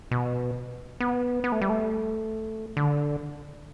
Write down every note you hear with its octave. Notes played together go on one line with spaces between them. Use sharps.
B2
B3
B3
A3
G3
A3
D3